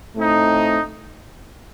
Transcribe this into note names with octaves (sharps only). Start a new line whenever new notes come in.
A2 A3 C4 D#4